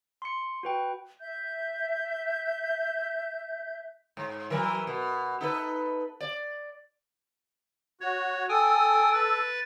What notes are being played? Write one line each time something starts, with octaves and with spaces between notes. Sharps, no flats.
C6 C#7
F#4 B4 G5
E5 G6
G#2
E3 F#3 A#4
B2
D#4 A4 B4
D5
F#4 C#5
A4 G5 G#5 D#6
B4 A6